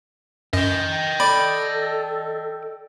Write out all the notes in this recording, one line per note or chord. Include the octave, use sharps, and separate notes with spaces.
F#2 D#5 G5
A4 D5 B5